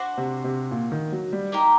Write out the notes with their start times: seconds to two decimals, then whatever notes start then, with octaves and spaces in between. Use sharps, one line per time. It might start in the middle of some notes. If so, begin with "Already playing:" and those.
Already playing: D4 F#4 C5
0.17 C3
0.44 C3
0.71 A#2
0.92 D#3
1.12 F#3
1.33 G3
1.52 A#3 D#4 G4 A#4